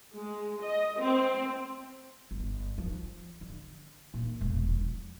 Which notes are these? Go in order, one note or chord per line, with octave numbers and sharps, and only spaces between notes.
G#3
D#5
C4
G1
F3
D3
A#2
E1
F3